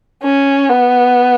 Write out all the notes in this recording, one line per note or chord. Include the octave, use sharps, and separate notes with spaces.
C#4
B3